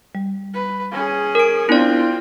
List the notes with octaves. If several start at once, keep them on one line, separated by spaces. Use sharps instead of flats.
G3
B4
C#4 G#4
A#4 D7
B3 C4 D4 E4 F4 D5